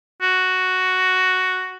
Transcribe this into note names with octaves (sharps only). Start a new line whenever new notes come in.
F#4